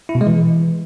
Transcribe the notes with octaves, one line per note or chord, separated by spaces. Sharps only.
E4
B2
G#3
E3